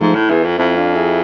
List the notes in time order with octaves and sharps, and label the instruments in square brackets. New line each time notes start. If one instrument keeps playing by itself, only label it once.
[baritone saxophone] G#2 [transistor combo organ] F3 A3
[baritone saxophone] A2
[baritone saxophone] E2 [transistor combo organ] E4 G#4
[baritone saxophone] F2
[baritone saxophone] F2 [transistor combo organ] C4 E4
[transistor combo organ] D4 F4
E4 G#4